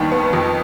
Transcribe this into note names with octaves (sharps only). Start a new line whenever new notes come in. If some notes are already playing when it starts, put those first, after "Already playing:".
Already playing: D#2 D#3 G3 B3 A5
B3
F2